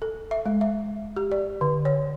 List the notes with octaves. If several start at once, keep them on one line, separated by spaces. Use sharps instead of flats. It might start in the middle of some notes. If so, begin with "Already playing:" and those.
A4
E5
G#3
E5
G4
D5
D3
C#5